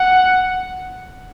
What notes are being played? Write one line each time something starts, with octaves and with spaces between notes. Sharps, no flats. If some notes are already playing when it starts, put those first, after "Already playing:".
Already playing: F#5